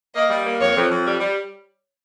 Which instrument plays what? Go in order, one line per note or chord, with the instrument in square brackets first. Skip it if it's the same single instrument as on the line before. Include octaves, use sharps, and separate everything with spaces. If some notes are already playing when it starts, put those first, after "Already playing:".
[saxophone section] A#3 [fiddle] D#5
[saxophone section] G3
A#3
[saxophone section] F2 [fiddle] C#5
[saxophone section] F2
F2
G3
G3